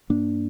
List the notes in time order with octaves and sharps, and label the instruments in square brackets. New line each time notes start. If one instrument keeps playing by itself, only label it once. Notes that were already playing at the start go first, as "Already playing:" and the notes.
[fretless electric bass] G2 A#3 D4